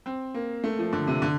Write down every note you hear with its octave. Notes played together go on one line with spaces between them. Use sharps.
C4
A#3
A3
F3
D3
C3
D3